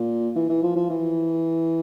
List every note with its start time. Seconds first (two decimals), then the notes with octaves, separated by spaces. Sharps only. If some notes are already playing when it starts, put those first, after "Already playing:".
Already playing: A#2
0.35 E3
0.49 E3
0.63 F3
0.76 F3
0.90 E3